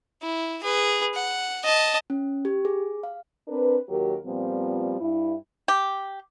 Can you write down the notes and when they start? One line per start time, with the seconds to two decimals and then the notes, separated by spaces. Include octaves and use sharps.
0.22 E4
0.63 G#4 B4
1.15 F#5
1.63 D#5 A5
2.10 C#4
2.45 G4
2.65 G#4
3.03 F5
3.48 C4 D4 A#4 B4
3.89 D#2 F#3 G4 A#4
4.26 A#2 F3 G3 B3 C4
5.00 G2 E4
5.68 G4